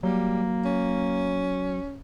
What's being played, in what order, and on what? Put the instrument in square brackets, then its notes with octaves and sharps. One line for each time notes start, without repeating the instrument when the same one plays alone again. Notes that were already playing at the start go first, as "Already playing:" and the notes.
[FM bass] F#3 [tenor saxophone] G3 [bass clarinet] A#3
[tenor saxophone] C#4